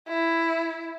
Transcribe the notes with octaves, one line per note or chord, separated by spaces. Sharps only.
E4